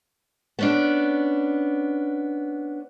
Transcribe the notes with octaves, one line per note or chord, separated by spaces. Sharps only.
B3 C#4 D4